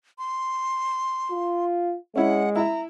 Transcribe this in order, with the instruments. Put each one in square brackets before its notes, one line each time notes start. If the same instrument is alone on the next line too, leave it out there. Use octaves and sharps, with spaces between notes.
[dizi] C6
[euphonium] F4
[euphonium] G#3 [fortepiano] C#4 E4 [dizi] F#5
[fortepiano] E4 E5 [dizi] A#5